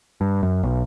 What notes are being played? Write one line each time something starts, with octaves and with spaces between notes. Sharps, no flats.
G2
F#2
B1